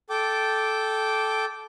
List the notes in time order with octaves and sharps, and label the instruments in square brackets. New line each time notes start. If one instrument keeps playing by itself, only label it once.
[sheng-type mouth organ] A4 G5 D6